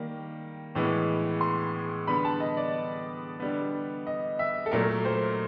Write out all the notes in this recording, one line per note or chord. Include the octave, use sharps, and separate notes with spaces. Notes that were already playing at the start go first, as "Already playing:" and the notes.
Already playing: D#3 G3 A#3
A2 E3 G#3 B3
C6
D3 G3 B3 B5
A5
D#5
D5
D3 G3 B3
D#5
E5
A4
A#2 F#3 A3 A#4
C5